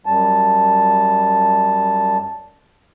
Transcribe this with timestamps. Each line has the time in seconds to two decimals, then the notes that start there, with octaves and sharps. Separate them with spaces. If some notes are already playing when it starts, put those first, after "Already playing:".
0.06 F#2 G3 A5